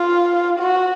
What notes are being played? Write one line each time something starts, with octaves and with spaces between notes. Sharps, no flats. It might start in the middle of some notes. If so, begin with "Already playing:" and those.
Already playing: F4
F#4